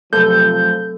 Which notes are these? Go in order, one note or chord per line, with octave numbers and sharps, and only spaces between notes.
C3 F3 F#3 A3 C4 A4 G6